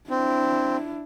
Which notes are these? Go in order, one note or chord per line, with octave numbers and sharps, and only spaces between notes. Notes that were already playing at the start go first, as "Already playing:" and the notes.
C4 D4 E4